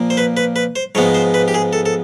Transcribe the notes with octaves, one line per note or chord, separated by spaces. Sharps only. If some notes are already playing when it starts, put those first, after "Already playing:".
Already playing: A#2 F3 A#3
C5
B4
B4
B4
C5
G#2 F3 G#3 B3 C#5
C5
B4
G4
G#4
A4
A4